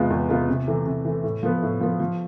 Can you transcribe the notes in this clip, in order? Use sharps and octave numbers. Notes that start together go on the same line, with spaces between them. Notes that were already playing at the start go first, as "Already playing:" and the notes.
Already playing: E2 C3 G#3 B3 F4
E2
C3 G#3 B3 F4
C3
E3 A3
C3
E3 A3
A2
F3 B3
A2
F3 B3
F3